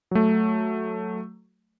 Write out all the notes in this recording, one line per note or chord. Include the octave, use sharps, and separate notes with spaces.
F#3 A3